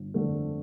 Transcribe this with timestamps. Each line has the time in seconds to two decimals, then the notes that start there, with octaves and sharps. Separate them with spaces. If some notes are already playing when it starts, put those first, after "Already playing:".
Already playing: G1
0.14 F2 D3 A3